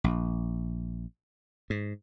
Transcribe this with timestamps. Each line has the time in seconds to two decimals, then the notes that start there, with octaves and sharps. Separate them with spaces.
0.04 A#1
1.70 G#2